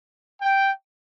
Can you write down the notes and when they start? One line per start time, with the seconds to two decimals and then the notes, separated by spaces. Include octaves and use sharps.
0.41 G5